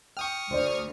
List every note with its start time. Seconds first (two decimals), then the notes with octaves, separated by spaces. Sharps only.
0.17 G5 C#6 D#6 F6
0.51 D2 C5 D5